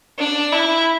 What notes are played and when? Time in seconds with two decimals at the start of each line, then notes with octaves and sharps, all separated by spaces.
0.19 D4
0.52 E4